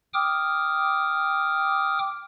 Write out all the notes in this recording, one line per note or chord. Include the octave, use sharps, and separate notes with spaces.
G5 D6 D#6 F6